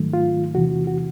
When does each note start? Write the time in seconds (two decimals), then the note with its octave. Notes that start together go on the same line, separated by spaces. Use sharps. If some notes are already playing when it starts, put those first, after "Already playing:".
Already playing: G#2 D#3 F#3 A3
0.13 F4
0.55 E2 C3 E3 F#4
0.87 F#4